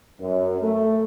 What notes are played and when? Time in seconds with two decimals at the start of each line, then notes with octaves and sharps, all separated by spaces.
0.20 F#2
0.62 A3